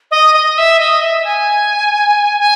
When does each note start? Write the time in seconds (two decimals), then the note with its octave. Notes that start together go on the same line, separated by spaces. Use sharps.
0.11 D#5
0.34 D#5
0.58 E5
0.79 D#5
1.02 E5
1.24 G#5
2.39 G#5